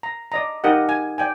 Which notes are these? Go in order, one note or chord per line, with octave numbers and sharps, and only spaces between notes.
A#5
D5 D#5 A#5
D#4 G4 A#4 D#5 F#5
G#5
D5 G5 G#5